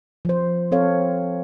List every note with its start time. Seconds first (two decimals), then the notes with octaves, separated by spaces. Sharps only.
0.25 F3 C5
0.72 C4 A4 C#5 F5